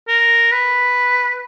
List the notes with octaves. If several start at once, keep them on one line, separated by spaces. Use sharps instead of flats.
A#4
B4